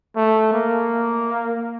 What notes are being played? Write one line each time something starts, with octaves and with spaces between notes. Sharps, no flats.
A3
A#3